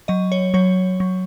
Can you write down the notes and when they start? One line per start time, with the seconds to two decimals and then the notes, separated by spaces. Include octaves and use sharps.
0.08 F#3 D#5
0.32 C#5
0.54 F#3 C#5
1.00 F#3